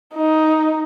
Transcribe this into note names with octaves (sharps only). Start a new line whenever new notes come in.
D#4